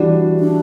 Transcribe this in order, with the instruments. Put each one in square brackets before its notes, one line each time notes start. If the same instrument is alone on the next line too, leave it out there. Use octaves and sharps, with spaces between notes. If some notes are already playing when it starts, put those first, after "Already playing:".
Already playing: [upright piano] E3 G3 D4 F#4
[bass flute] D4